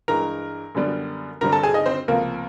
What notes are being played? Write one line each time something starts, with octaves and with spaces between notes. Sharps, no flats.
G2 E3 G#3 A#4 A#5
F#2 D3 G3 B3 D4
G2 D3 G3 C4 A#4 A#5
A4 A5
G#4 G#5
D#4 D#5
C4 C5
C#2 C3 F3 A3 A#3 A#4